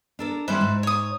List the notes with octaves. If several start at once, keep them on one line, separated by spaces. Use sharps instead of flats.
D4 A4 A#4
D#3 G3 C#4 E4 B4 C5
G#2
C#5 D#6